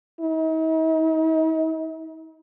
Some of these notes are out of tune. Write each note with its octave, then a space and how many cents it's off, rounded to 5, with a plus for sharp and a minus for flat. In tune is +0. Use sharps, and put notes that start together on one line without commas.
D#4 +45